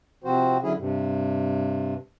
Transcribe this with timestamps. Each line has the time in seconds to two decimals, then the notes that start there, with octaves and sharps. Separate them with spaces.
0.24 C3 F3 C4 F#4 C5
0.63 D3 F#3 C#4 E4 G#4
0.77 G2 C3